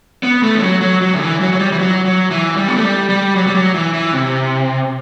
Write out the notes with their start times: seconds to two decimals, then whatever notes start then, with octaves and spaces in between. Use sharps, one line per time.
0.23 B3
0.43 A3
0.55 E3
0.62 F#3
0.81 F#3
1.01 F#3
1.13 D3
1.20 E3
1.41 F#3
1.53 F#3
1.60 G3
1.72 E3
1.79 F#3
2.05 F#3
2.31 E3
2.57 G3
2.68 B3
2.76 A3
2.83 G3
3.09 G3
3.35 F#3
3.47 G3
3.54 F#3
3.74 E3
3.93 E3
4.13 C3